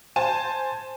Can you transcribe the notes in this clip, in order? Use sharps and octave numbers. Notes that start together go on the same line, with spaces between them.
C5 G#5 A5